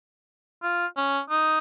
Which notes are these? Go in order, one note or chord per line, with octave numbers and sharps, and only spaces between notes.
F4
C#4
D#4